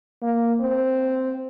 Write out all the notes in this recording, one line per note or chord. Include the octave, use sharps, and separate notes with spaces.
A#3
C4